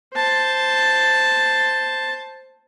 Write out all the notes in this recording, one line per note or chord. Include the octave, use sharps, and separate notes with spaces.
C5 A5